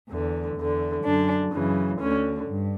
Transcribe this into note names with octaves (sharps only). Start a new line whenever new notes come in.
E2 D3
E2 D3
F#2 D3 D4
F#2 C#3 E3
D2 D3 C#4
G2